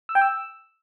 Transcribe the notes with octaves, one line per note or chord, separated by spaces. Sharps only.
E6
G5
E6